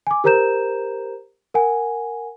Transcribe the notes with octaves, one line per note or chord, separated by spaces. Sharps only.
G#5 D6
G4 A#4 C5 A#5 G6 E7
A#4 F#5 G#5